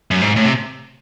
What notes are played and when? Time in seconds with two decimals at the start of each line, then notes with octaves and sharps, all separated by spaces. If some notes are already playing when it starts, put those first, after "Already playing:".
0.11 F#2
0.21 G#2
0.36 A2
0.44 C3